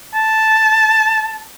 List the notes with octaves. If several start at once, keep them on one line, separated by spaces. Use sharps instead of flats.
A5